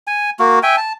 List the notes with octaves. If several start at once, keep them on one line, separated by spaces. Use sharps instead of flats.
G#5
A#3 F#4
E5 G5 G#5
A5